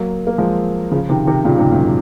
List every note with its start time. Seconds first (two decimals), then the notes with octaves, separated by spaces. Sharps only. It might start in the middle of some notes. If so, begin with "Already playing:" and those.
Already playing: F#3 A#3
0.27 A#3
0.38 F3 G#3
0.91 C#3 F3
1.09 C3 D#3
1.27 C3 D#3
1.44 A#2 C#3
1.58 G#2 C3
1.71 F#2 A#2